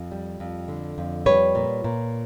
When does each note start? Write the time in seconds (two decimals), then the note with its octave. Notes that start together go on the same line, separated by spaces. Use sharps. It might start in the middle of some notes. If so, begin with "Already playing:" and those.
Already playing: F2
0.12 G3
0.40 F2
0.68 D3
0.98 F2
1.26 G3 B4 C#5
1.55 A#2
1.84 A#2